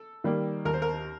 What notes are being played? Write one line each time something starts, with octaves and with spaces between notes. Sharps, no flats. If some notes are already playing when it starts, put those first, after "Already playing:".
Already playing: A4
D#3 G3 A#3
D#2 A#4
C5
A#4